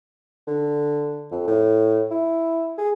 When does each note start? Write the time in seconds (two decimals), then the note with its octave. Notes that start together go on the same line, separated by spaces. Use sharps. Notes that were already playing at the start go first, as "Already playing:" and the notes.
0.47 D3
1.32 F2
1.47 A2
2.11 E4
2.78 G#4